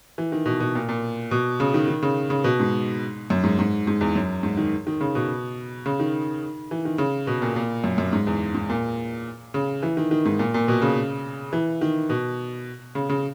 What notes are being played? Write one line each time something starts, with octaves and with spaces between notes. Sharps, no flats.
E3
D#3
B2
B2
A#2
A#2
B2
C#3
D#3
D#3
C#3
C#3
B2
G#2
F#2
G#2
G#2
G#2
E2
F#2
G#2
D#3
D#3
C#3
B2
C#3
D#3
E3
D#3
C#3
B2
A#2
A#2
F#2
F#2
G#2
E2
G#2
A#2
C#3
E3
D#3
D#3
G#2
A#2
A#2
B2
C#3
E3
D#3
B2
C#3
C#3